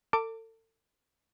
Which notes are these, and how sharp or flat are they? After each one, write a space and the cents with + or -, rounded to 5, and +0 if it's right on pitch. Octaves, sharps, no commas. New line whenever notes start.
A4 +35 D6 +0